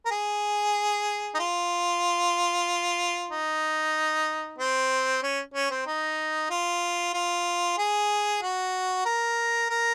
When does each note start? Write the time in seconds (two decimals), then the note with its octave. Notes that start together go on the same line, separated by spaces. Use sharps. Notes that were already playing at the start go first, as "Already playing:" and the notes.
0.05 A#4
0.11 G#4
1.34 D#4
1.39 F4
3.30 D#4
4.58 C4
5.23 C#4
5.54 C#4
5.71 C4
5.87 D#4
6.50 F4
7.14 F4
7.78 G#4
8.42 F#4
9.05 A#4
9.70 A#4